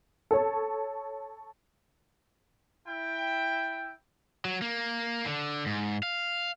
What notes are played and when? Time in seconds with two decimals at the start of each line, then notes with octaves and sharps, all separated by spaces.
0.31 A4 C#5
2.87 E4 G5
4.45 F#3
4.62 A#3
5.26 D3
5.66 G#2
6.03 F5